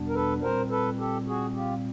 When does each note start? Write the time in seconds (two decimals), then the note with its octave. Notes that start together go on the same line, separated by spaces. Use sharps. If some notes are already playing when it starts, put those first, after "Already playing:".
Already playing: E2 B2 G3 B3 D4
0.08 A#4
0.14 A4 B4
0.42 A#2 G3 C4 A#4 C5
0.70 A4 B4
0.98 G4 A4
1.26 F#4 G#4
1.54 F4 G4